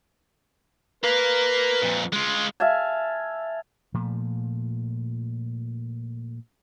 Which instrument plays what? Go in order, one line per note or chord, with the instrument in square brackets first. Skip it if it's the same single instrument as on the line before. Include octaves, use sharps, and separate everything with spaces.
[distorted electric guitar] A#4 F5 [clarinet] B4
[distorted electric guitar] F2 A#2
G#3 F4
[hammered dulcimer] E5 F5 G#5 A5
[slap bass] A#2 F3 A3